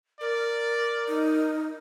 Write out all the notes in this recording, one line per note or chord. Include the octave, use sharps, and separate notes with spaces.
A#4 D5
D#4